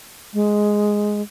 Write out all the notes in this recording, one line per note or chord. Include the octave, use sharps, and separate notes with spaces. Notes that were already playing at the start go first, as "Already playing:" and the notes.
G#3